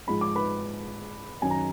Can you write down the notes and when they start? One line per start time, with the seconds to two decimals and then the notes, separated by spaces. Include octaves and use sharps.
0.07 G#2 F3 G#3 B5
0.21 D6
0.35 B4 B5
1.42 F#2 D#3 F#3 G#5
1.51 A#5